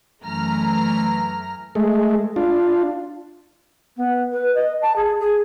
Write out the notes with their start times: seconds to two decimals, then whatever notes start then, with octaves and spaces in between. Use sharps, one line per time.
0.21 F#2 E3 A3 A#5 F6
1.75 G#3 A3
2.36 D4 F4
3.96 B3
4.32 B4
4.54 D#5
4.81 A5
4.95 G#4
5.19 G#4